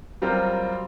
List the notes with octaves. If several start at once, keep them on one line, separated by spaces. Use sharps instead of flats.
F#3 G3 C4 F4 A#4 C5